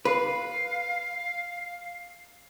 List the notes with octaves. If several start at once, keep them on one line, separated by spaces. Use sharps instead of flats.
B4 F5